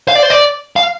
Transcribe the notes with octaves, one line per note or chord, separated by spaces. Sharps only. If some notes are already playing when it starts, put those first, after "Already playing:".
F5
D5
C5
D5
F5